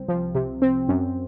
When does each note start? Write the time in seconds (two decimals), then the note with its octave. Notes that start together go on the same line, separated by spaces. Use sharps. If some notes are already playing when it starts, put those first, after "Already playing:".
Already playing: C2 C3 C4
0.08 F3
0.35 C3
0.62 C4
0.88 F#2